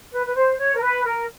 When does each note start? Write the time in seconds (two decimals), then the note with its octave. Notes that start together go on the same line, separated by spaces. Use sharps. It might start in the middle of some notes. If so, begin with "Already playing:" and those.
0.12 B4
0.25 B4
0.34 C5
0.58 C#5
0.74 A#4
0.81 B4
1.04 A#4